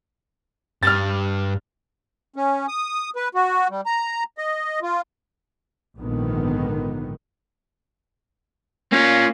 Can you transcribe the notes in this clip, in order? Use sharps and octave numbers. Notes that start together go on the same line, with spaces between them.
G2 F6 A6
C#4
D#6
B4
F#4
G3
A#5
D#5
F4
A#1 G#2 D3 D#3 B3
A#3 C#4 F4